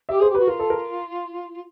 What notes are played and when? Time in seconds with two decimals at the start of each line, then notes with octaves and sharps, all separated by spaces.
0.09 G4 E5
0.19 G#4 C5
0.29 G4
0.35 B4
0.38 F#4
0.47 F4 A#4
0.59 A4
0.70 A#4